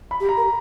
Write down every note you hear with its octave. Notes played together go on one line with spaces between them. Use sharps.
B5
G4
A#5
A#4